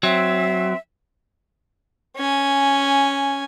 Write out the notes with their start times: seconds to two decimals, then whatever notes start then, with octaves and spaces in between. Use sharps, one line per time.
0.03 F#3 C4 E5
2.17 C#4 G#5